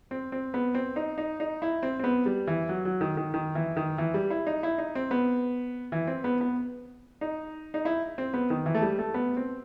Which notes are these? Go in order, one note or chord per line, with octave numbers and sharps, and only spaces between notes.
C4
C4
B3
C4
D#4
D#4
D#4
E4
C4
C4
B3
G3
E3
F#3
F#3
D#3
D#3
D#3
E3
D#3
E3
G3
E4
D#4
E4
D#4
C4
B3
E3
C4
B3
B3
D#4
D#4
E4
C4
B3
D#3
E3
A3
G3
A3
B3
C4